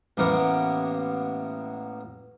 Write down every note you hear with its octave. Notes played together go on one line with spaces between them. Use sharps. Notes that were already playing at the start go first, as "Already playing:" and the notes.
A1 A#3 B3 D6